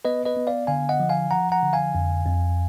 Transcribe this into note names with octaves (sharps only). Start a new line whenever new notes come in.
B3 B4 D#5
B4 D#5
B3
D5 F5
D3 F5 G#5
D#5 F#5
F3
F5 G#5
F3 F#5 A#5
F#5 A#5
D3
F5 G#5
F2
F2